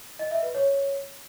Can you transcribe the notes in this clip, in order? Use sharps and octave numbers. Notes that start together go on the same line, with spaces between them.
D#5
E5
B4
C#5